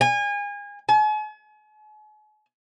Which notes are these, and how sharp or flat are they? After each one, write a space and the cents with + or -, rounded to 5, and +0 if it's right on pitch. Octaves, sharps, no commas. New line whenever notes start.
G#5 -30
G#5 +45